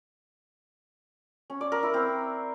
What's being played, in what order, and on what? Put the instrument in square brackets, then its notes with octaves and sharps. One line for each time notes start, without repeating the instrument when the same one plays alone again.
[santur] C#4
D5
A#4
E4
C4